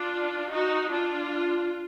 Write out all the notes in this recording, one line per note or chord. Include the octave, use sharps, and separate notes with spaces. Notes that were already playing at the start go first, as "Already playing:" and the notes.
Already playing: D4 F4
D#4 F#4
D4 F4